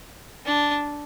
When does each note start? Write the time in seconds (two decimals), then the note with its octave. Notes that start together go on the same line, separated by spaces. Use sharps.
0.46 D4